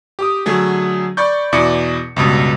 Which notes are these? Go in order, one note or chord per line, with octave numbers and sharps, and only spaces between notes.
G4 D6 D#6
D3 F#3 A3 G#4
D5 B5 C#6 G6
E2 B2 E4 D5 D6 C#7
C#2 G2 B2